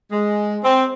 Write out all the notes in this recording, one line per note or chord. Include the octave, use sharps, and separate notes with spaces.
G#3
C4